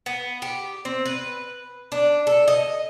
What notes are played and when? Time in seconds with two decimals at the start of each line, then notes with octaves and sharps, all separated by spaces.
0.06 B3
0.42 G4
0.85 C4
1.06 B4
1.92 D4
2.27 A4
2.48 D#5